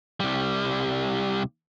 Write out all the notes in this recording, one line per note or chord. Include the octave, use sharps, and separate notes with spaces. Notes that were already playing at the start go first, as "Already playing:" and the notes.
C2 G3